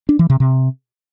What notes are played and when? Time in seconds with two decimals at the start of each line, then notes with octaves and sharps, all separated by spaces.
0.09 D4
0.19 E3
0.30 C3
0.40 C3